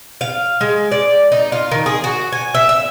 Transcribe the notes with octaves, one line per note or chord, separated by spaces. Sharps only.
F5
G#3
D5
D#4
F4
D#3
G#4
F#4
G#5
E5
E5